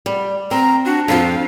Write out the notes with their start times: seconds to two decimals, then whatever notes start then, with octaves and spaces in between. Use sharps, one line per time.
0.06 G3
0.51 C4 A#5
0.85 D4 F#4
1.08 F2 F3 C4 F5